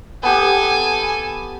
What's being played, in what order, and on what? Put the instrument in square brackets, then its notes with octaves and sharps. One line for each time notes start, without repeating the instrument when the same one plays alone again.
[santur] B3 G4 [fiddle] A4 G#5